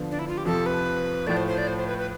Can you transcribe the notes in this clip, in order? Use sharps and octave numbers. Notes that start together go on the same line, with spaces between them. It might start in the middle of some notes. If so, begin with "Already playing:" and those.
Already playing: D3 F3 B3
D4
E4
F4
G4
F2 C3 F3 A4
B4
A2 F3 A3 D5
C5
C5
D5
C5
C5
B4
B4